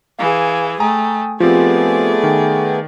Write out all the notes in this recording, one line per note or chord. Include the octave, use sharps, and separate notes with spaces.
E3 G#4 F5 G#5
A3 G5 G#5 A#5 D#6
F3 A3 B3 C4 F4 G4 G#4 D5
D#3 G5